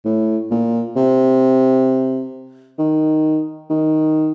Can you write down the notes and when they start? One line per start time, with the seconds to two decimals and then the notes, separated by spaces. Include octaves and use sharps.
0.05 A2
0.51 A#2
0.96 C3
2.78 D#3
3.70 D#3